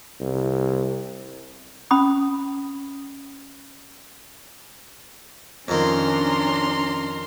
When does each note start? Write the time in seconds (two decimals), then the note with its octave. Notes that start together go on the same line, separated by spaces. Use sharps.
0.20 C2
1.91 C#4 B5 D#6
5.68 F2 D#3 C#4 D4 A#5 C6